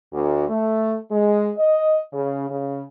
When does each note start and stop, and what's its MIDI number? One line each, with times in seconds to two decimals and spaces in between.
0.13 0.48 38
0.49 0.98 57
1.11 1.50 56
1.58 1.98 75
2.12 2.48 49
2.50 2.81 49